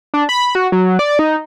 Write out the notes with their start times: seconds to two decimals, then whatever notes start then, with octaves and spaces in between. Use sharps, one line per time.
0.14 D4
0.29 B5
0.55 F#4
0.72 F#3
0.99 D5
1.19 D#4